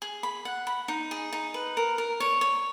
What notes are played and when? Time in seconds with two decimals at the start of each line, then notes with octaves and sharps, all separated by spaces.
0.02 G#4
0.23 B5
0.45 F#5
0.67 B5
0.88 D#4
1.11 G#4
1.33 D#4
1.54 B4
1.77 A#4
1.98 A#4
2.20 C#5
2.41 C#5